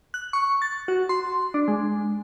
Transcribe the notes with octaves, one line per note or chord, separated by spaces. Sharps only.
F#6
C#6
A6
F#4
C6
D4
G#3